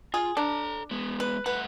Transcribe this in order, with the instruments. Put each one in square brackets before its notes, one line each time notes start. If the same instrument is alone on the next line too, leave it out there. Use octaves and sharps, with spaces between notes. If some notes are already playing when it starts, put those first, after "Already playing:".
[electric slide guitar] F4 [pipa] G#4
[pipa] D4 [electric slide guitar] A4 A#5
[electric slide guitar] G#3 B3
[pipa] B4
[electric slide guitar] G2 A3 F#5 [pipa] B4